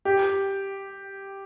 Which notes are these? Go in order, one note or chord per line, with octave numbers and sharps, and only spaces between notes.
G4